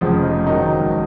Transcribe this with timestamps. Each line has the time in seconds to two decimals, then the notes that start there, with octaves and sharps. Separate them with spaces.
0.01 F1 F2 C#3 F3
0.23 D#4
0.46 G#1 G#2 D#3 F#3 D#4